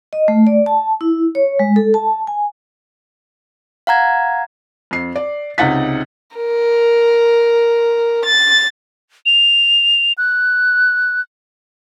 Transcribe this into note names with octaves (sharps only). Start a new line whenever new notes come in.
D#5
A3
D5
A5
E4
C#5
G#3
A4
A5
G#5
F5 F#5 A#5 G#6
F2 C7
D5
C#2 C3 D#4 F#5 A6 B6
A#4
A6
F7
F#6